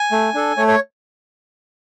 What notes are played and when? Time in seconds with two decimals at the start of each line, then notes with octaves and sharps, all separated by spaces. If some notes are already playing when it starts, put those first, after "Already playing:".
Already playing: G#5
0.12 A3
0.34 D4 A4
0.57 A3 C#5
0.68 C#5